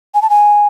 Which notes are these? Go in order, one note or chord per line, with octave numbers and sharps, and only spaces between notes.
G#5
A5
G#5